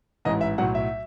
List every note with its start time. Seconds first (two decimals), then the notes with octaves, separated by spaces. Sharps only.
0.25 A1 G#2 E3 D#5
0.41 E5
0.58 B1 A2 F#3 F#5
0.75 E5